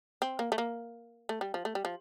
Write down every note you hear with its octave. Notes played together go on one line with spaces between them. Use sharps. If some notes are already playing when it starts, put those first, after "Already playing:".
C4
A#3
A3
A#3
A3
G3
F3
A3
G3
F3